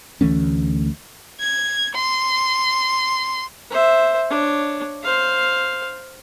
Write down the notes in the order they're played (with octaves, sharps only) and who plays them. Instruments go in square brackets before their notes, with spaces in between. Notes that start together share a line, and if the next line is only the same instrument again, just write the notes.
[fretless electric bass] D2 E3 A3 C#4
[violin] G#6
C6
[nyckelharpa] C5 E5
D4 C#5
C5 F5